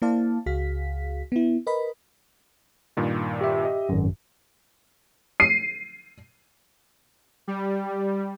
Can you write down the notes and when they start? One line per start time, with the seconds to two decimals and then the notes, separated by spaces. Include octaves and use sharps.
0.02 A#3 E4 C5 D5 F5 A5
0.46 C#2 F#4 G#4 F5 B6
1.32 B3 E4
1.67 A#4 B4 D#5 B5
2.97 G2 A#2 D#3
3.41 G4 E5
3.65 D#5
3.89 G#1 F#2
5.40 C7 D#7
7.48 G3